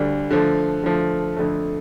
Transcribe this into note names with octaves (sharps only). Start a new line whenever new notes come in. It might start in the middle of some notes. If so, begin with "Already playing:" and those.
Already playing: D2 D3 G3 D4
D3 F3 A3
D3 F3 A3
F2 D3 A3